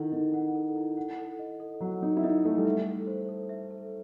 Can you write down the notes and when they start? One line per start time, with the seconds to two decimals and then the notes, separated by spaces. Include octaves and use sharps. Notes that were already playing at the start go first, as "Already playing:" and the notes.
Already playing: D#3 E4 A4 D#5 F#5
0.12 D#3 D#5
0.34 F#5
0.55 A4
0.76 E4
0.97 F#5
1.18 A4
1.39 D#5
1.60 A4
1.81 F#3 F#5
2.02 D#4 A4
2.17 E4
2.23 D#4 D#5
2.44 A3 A4
2.58 G3
2.65 E5
2.71 A3
2.87 A4
3.07 C5
3.29 A4
3.49 E5
3.71 A4